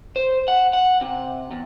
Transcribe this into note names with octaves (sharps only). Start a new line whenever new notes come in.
C5
F#5
F#5
C3
E2